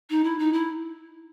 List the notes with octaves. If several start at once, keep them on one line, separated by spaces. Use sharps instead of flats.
D#4
E4
D#4
E4